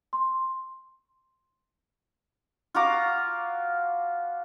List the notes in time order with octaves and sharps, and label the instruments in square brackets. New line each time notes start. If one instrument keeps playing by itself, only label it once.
[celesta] C6
[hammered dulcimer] F4 F#4 A#5 D6